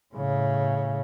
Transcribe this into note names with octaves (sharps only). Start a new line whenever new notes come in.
A2 C#3